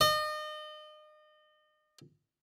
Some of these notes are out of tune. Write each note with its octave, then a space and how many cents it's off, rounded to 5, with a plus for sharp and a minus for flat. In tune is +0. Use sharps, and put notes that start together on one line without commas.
D#5 -35